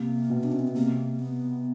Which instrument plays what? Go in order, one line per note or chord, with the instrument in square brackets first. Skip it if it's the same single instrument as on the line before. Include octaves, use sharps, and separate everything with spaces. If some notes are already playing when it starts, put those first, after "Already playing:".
Already playing: [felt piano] C3 [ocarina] A#3
[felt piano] B2
[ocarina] D4
C#4
C4
B3
[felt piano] C3 [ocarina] A#3
[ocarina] B3